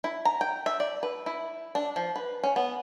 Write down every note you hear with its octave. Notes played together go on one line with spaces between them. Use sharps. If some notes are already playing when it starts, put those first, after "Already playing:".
E4
A#5
G5
E5
D5
B4
E4
D4
F3
B4
C#4
B3